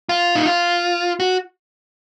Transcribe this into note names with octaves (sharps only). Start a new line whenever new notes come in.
F4
D#4
F4
F#4